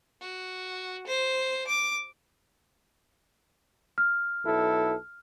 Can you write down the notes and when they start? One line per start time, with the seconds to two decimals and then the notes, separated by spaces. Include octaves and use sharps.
0.21 F#4
1.07 C5
1.67 D6
3.98 F6
4.45 B1 E4 A4